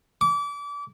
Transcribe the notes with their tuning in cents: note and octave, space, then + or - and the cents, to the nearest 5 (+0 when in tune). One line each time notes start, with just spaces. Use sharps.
D6 -30